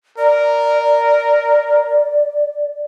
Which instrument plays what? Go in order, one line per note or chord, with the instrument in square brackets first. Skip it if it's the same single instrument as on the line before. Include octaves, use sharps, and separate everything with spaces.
[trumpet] A#4 [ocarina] D5